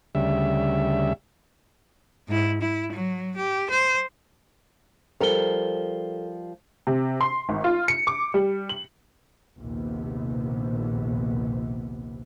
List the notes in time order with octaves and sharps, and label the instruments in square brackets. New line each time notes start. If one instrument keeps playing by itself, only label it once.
[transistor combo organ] D2 C#3 G3 E5
[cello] G#2 E4
E4
F#3
G4
C5
[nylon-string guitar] F3 G3 A#4 [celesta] A4 G7
[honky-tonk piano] C3
C6
G#1
F4
C#7
D6
G3
F#7
[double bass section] A#1 D#2 C3 B3